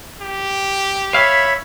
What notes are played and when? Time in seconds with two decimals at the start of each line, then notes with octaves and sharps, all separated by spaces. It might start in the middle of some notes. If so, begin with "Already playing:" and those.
0.22 G4
1.14 C#5 E5 F5 B5